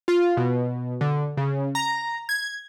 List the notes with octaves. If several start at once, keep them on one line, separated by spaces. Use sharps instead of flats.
F4
B2
D3
C#3
A#5
G#6